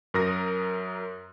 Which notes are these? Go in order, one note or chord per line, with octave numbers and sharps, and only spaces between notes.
F#2 A#4 D#6 A#6